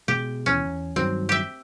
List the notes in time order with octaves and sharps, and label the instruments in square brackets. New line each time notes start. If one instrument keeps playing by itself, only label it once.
[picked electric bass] B2 G#3 [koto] G4
[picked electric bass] D#2 B2 E3 [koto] C#4
[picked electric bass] E2
[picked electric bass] G2 D#3 F#3 [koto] C4
[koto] G4 E5